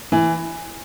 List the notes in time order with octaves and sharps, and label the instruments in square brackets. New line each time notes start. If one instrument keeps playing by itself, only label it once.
[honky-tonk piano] E3